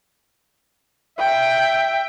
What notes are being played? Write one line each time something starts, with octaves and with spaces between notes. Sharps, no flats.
E5 G5